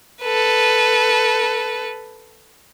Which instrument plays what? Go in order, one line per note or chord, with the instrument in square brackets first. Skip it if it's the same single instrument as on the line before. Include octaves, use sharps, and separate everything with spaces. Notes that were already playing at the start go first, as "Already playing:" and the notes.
[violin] A4 B4